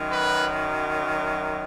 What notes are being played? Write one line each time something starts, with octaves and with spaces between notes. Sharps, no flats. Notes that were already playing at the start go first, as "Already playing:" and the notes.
Already playing: F#2 D#3 F#3
B4